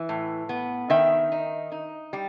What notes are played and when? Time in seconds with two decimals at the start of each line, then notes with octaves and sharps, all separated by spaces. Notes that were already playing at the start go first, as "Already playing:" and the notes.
Already playing: E3
0.09 A2
0.49 B3
0.90 D#3 E5 G5
1.32 D#4
1.72 D#4
2.13 G3